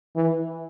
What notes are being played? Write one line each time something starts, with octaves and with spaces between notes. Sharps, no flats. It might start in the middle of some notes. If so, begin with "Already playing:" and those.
E3